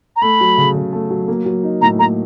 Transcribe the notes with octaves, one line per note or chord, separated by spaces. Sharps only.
A#5
A3 B5
F#3
C#3
C#3
A3
F#3
A#3
F#3
D#4
A2 A#5
A#3 A#5